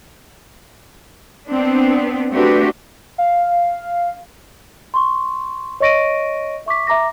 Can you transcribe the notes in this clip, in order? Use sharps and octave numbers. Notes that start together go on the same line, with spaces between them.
B3 C4 D4
A3 C4 D4 F#4 G4 B4
F5
C6 C#6
C#5 D#5 C#6 A#6 D7 D#7
E5 C#6 D6 B6
E5 A#5 D6 A#6